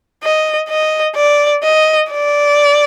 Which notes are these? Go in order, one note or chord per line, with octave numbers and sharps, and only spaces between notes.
D#5
D#5
D5
D#5
D5